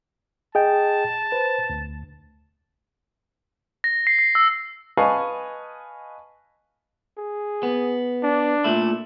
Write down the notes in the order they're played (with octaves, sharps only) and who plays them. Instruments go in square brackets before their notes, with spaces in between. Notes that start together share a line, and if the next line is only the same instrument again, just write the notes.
[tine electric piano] G#4 D#5 G5 [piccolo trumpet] A5
[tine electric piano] B4 C5
D2
[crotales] A#6
C7
C7
E6
[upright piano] B4 D#5 F5 G#5 A5 C#6
[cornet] G#4
[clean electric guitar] B3
[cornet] D4
[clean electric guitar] A#2 A3 E4